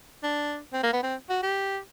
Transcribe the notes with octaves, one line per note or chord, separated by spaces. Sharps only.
D4
C4
A#3
B3
C4
F#4
G4